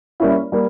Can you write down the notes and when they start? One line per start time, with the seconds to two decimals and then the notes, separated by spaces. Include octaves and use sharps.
0.20 G3 A#3 C#4 E4
0.52 G3 A#3